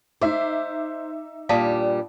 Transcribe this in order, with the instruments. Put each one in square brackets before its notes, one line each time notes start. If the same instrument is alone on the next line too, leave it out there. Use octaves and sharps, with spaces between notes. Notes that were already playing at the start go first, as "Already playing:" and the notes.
[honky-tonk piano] D#4 E5 D6 [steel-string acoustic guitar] C5
[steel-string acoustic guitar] G2 A#2 G3 [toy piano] F5 A5 D#6